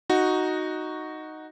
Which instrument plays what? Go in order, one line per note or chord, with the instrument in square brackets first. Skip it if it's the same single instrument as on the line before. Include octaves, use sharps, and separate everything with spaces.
[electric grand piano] D#4 F#4